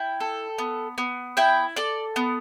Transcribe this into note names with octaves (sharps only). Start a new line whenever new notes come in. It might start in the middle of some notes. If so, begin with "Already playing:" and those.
Already playing: E4 G5
A4
B3
B3
E4 G5
A4 D5
B3